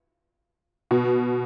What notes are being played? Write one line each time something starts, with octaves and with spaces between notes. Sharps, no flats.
B2